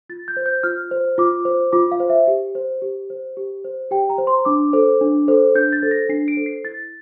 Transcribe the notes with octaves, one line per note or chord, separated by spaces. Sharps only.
F4 A6
G6
C5
G6
F4 F6
C5
F4 D6
C5
F4 D6
F5
C5
E5
G4
C5
G4
C5
G4
C5
G4 G5
A#5
C5
C6
D4 D6
A4 C5
D4
A4 C5
D4 G6
A6
A4 C5
A#6
D4 C7
D7
A4 C5
C7
E4 A6